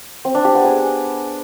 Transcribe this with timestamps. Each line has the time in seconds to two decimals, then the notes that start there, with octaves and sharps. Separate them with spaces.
0.25 C4
0.35 D4
0.45 G4
0.54 B3
0.64 G#4